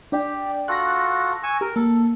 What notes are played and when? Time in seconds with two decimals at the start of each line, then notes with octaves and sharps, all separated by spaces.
0.12 D4 G4 D5 G5
0.68 F4 F#4 A4 F#6 A#6
1.43 G#5 C#6 E6
1.61 G4 A#4
1.76 A#3 A4